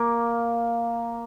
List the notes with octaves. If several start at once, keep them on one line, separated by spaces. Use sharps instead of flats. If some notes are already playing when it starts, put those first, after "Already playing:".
Already playing: A#3